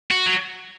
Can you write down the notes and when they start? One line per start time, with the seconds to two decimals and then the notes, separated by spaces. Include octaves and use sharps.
0.11 F#4
0.26 F#3